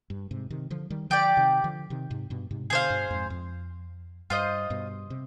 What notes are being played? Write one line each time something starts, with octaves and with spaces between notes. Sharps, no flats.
G2
G#2 C3
C3 D#3
D3 F3
D#3 G3
D3 F3 G4 D5 G5
C3 D#3
D3 F3
C3 D#3
G#2 C3
G2 B2
G#2 C3
B2 D3 G#4 C5 F5
G2 B2
F2 G#2
F2
G2 F4 C5 D#5
G2 B2
C3